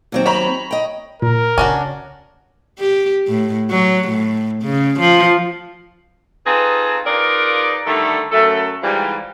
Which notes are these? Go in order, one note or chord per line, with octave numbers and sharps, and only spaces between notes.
D#2 F#3 C4
C#5 A#5 B5
D#5 G5
A#2 A#4
C#3 C#4 D4 F#4
G4
A2
F#3
A2
C#3
F3
C4 D#4 F4 G#4 A4 B4
D#4 F4 G#4 A#4 B4 D5
D3 D#3 G3 A3 A4
F#2 A3 A4
G#2 E3 F3 G3